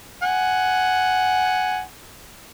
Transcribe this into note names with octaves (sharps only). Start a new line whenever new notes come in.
F#5 G#5